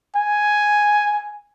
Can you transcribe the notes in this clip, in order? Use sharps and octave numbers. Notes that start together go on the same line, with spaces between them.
G#5